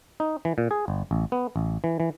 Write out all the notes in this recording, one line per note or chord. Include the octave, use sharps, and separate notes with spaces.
D#4
E3
A#2
G#4
G1
A1
B3
A1
E3
E3